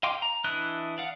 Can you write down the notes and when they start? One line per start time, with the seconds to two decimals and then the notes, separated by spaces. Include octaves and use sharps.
0.03 D#5 F5 G5 C6 D6
0.22 A#5
0.44 E3 D4 E4 D#5 F#6
0.98 D5 F5 F#5